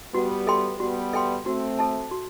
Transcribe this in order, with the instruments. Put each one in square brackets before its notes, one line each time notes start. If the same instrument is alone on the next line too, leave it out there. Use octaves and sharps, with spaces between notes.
[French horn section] G3 B3 [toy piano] F#4
[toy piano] A4 E5 G5 C6
[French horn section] G3 B3 [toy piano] F#4
[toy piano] A4 E5 G5 C6
[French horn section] A3 C4 [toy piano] F#4
[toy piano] A4 E5 A5
F#4